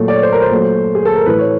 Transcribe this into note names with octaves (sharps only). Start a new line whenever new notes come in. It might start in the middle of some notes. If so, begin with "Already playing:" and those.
Already playing: A#2 F#3 A3
D5
C#5
C5
A#4
C5
A#2 F#3 A3
G#4
A4
A#4
A2 E3 A3 B4
C#5